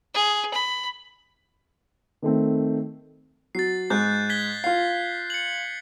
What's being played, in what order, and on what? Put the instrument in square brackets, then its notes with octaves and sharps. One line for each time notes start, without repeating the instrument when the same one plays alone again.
[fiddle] G#4
B5
[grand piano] D#3 A3 C4
[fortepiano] F#3 [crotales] A6 C7
[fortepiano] G#2 [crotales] F#6 G6
[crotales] G#6 B6 G7
[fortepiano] F4 F5 [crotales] C7
[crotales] C#7 F#7